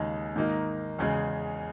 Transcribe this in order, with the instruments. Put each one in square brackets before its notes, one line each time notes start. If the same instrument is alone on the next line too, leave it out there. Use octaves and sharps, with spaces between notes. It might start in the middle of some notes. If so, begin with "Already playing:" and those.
Already playing: [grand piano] D#2 C#3 G#3 D#4
G#2 D#3 A#3 D#4
E2 C#3 G#3